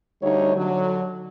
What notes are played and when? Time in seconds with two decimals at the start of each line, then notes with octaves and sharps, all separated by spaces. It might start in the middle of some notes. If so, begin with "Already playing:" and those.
0.23 D2 D3 G3 D#4 C#5
0.56 D3 F#3